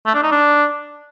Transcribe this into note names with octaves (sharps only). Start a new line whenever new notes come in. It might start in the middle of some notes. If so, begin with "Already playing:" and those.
A3
D4
D#4
D4